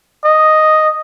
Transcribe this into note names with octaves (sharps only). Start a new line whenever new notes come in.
D#5